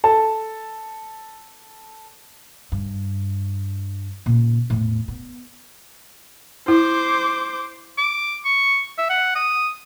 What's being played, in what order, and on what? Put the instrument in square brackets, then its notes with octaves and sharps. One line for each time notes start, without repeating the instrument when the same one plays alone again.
[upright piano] A4 A5
[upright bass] G2
A#2 C#3
E2 A2
B3
[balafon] E4 [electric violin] C5 D6
[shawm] D6
C#6
E5
F#5
D#6